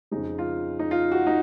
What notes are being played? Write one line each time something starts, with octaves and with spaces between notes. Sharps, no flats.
F2 C#3 G#3 D#4
F4
D#4
F4
F#4
D#4